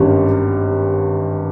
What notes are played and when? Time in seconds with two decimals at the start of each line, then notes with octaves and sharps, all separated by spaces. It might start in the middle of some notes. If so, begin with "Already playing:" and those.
Already playing: G#1 G2 G3 C#4